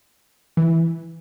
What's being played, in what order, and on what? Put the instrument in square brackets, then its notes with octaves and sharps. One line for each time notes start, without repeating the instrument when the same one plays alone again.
[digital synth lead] E3